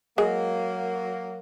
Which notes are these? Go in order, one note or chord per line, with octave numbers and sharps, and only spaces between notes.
F#3 G#3 A#3 G#4